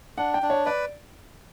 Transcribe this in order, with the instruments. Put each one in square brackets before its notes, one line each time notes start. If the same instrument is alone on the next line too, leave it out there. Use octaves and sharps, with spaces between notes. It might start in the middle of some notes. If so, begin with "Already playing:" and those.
[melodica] D4 [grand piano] F#5
[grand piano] G5
[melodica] D4
[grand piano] C#5
[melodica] B4 [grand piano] D5